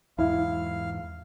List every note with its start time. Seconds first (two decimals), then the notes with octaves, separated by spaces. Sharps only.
0.18 E2 G#2 E4 F5